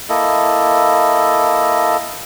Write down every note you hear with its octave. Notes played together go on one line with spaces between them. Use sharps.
A#3 E4 A4 D#5